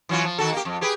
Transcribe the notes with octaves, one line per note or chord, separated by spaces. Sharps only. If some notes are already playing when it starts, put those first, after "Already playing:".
E3 F#3 F4
F3
D#3 F#4 A4
A#3 G4
F2
G4 G#4 B4